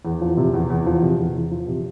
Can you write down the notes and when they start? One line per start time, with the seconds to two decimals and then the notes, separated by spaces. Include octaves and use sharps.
0.05 E2
0.21 F3
0.37 C3
0.54 E2
0.70 E2
0.86 F3
1.02 C3
1.19 E2
1.35 E2
1.51 F3
1.68 C3